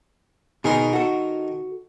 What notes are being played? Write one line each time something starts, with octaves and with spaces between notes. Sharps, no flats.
B2 D#3 G#4 A#4 C6
F#4 A4